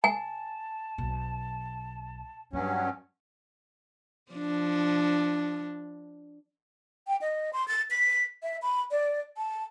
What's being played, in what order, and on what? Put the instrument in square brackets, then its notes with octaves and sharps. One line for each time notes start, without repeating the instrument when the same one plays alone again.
[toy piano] G#5 [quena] A5
[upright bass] B1
[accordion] G2 F#3 C#4 [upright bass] G#3
[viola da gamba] F3 D4
[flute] G5
D#5
C6
A6
B6
E5
B5
D5
A5